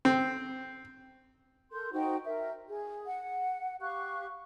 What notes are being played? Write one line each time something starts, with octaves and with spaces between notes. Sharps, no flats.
C4
A4 A#4 C6 G6
D#4 F#4 C5 G5
A#4 E5
G#4
F#5
G4 F5 C#6 F#6